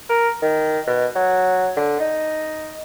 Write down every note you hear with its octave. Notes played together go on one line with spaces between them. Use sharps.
A#4
D#3
B2
F#3
D3
D#4